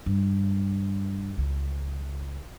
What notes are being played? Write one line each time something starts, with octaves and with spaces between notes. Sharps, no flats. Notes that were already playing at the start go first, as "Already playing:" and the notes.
G2
C#2